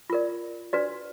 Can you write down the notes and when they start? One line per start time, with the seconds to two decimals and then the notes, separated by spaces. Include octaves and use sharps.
0.10 F4 A#4 D5
0.73 D4 F#4 B4 D5